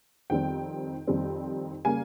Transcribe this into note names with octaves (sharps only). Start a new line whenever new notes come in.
F2 D#3 G3 C4 G5
F2 D#3 G3 C4
C#3 G3 A#3 G#5